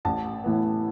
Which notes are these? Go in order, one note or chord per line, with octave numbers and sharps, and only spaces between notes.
A1 A5
A2 E3 B3